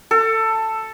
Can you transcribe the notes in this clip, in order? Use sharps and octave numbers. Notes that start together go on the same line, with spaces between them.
A4